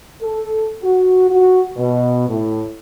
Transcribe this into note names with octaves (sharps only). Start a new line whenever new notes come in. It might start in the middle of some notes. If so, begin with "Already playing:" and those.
A4
F#4
F#4
B2
A2